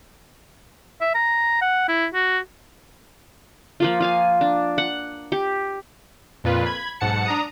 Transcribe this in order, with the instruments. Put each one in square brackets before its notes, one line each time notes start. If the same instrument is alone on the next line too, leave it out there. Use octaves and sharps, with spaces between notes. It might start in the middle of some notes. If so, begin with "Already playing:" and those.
[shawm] E5
A#5
F#5
E4
F#4
[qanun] F3 A#3 F4
F4 F5 G#5
D4
F#5
G4
[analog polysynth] F2 A#2 F4 B4
B5 G#6
B1 G#2 F#5 A5 C#7
D4 A#5 D#6